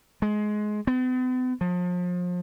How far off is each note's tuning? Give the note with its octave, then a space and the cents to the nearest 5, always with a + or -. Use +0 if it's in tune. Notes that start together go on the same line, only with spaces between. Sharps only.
G#3 +20
B3 +45
F3 +35